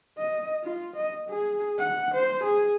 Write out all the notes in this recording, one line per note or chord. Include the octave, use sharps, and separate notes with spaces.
D#5
F4
D#5
G#4
F#5
C5
G#4